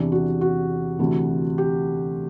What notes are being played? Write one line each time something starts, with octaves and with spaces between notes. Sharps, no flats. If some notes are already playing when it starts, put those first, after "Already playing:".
Already playing: E2 C3 E3 D4
F#4
F#4
D2 C3 E3
G4